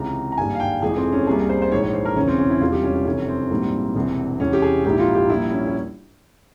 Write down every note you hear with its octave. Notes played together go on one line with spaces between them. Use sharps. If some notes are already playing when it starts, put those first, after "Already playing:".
Already playing: C#2 C3 E3 G#3 A#5
A#5
G#1 G2 G3 A#3 G#5
F5
G5
F1 F2 E3 G#3 G#4
C4
C#4
C2 C3 G3 A#3 G#4
C5
C5
A#1 G#2 E3 G#3 C#5
C#5
C5
A#4
E1 E2 C#3 E3 C#4
C4
C#4
E4
E1 E2 C3 G3 F4
G4
C#4
C#4
F1 E2 C3 E3 C#4
C4
A#1 G#2 E3 G3 A#3
E1 E2 C3
E1 E2 C3 E3 G#3 C#4
G4
G#4
A#1 G#2 E3 A#3 G4
E4
F4
G4
A#1 A#2 G3 A#3 E4
C#4
C#4